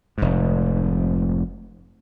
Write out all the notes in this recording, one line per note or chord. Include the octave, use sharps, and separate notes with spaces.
F1 G#2